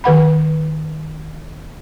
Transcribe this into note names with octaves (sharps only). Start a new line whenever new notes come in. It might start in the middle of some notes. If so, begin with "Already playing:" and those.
D#3 B4 F#5 B5